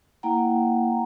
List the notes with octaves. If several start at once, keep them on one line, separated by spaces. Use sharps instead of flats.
A#3 E4 F#5 G5 A#5